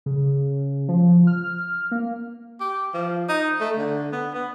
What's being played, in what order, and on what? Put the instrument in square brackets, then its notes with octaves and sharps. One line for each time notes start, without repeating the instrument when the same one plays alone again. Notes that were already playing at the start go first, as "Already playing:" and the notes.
[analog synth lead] C#3
F3
F6
A#3
[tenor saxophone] G4
F3
D#4
A3
D3
B3
B3